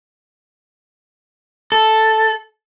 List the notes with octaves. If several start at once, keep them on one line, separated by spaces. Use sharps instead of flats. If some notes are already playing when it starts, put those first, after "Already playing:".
A4